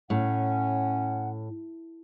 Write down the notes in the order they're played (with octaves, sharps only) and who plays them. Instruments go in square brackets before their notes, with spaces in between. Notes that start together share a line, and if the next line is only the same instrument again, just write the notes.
[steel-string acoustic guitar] A2 [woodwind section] C#4 [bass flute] F#5